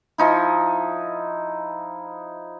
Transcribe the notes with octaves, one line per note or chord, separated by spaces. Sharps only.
F3 D#4 E4